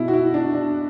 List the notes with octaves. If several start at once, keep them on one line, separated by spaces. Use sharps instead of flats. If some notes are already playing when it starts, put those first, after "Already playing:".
Already playing: B2 E4
F#4
E4
D4
D4